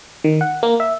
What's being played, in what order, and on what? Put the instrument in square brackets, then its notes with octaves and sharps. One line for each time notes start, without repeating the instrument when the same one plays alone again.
[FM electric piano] D#3
F#5
A#3
E5